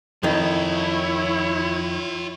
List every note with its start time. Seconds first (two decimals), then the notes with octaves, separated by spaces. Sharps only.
0.23 F2 D#3 E4 F4 C#5 D#5